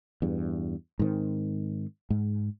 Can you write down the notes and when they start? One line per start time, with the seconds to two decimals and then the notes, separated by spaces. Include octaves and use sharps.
0.22 E2 G2
0.99 G#2 D#3 C4
2.10 G#2